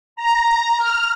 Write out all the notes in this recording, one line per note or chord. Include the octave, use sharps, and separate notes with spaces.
A#5
F6